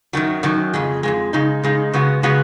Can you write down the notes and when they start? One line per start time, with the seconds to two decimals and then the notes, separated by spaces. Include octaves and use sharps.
0.13 F#2 D#3 F#3
0.43 F#2 D#3 F#3
0.74 F2 C#3 G#3
1.03 F2 C#3 G#3
1.33 C#3 G#3 D#4
1.63 C#3 G#3 D#4
1.93 C#3 G#3 B3 F#4
2.23 C#3 G#3 B3 F#4